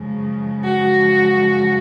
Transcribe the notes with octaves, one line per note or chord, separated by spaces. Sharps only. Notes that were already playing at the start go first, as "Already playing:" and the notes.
Already playing: F#2 C#3 F3 G#3
F#4